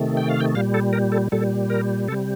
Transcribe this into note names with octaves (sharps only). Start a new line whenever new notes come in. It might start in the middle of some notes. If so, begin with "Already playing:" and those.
Already playing: C3 D#3 A3
G5
F5
G5
A#2 G3 F5
A4
A#4
A4
A#2 G3 A4
A#4
C3 G3 A4